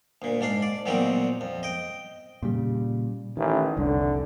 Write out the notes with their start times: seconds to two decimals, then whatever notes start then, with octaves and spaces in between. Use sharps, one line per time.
0.22 D2 A#2
0.41 G#2 D4 F5
0.62 D5
0.86 E2 A#2 F#3 G3 C4 D#4
1.41 F2
1.63 D#5 G5
2.43 A#2 C#3 G3
3.37 A1 D#3
3.77 F1 C2 D3